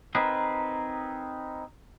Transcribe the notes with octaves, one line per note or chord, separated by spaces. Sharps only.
C4 D#4 G#4 A#4 B4